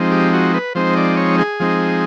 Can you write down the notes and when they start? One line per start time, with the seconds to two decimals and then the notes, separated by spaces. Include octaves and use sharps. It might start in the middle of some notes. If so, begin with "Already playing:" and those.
Already playing: F3 G#3 C4 D#4
0.11 G4
0.33 F#4
0.54 B4
0.75 F3 G#3 C4 D#4 C5
0.97 D5
1.17 C#5
1.39 G#4
1.60 F3 G#3 C4 D#4